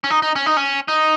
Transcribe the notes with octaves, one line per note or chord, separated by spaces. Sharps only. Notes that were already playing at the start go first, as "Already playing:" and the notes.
C#4
D#4
D#4
C#4
D#4
C#4
D#4